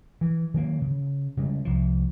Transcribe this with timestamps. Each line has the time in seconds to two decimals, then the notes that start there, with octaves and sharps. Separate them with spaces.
0.21 E3
0.54 D#3 F#3 A#3
0.82 C#3
1.37 C#3 G3 G#3
1.65 C2 F3